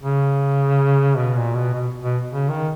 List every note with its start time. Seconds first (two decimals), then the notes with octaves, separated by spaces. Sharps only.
0.03 C#3
1.17 B2
1.36 A#2
1.55 B2
1.73 B2
2.03 B2
2.31 C#3
2.49 D#3